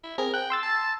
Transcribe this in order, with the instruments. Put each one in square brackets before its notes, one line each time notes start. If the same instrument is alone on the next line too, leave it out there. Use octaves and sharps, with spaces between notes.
[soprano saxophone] E4
[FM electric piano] C4 G#4 [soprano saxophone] A#4
[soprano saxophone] G5 [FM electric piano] F#6
[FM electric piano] C6 E6 A6
[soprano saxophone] A5